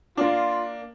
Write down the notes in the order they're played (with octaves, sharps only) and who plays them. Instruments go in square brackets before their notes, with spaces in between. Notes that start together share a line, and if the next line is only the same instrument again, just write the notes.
[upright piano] A#3 D4 [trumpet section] F4